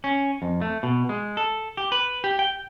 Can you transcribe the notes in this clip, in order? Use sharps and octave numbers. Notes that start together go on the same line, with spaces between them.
C#4
F2
A3
B2
G#3
A4
G4
B4
G4
G5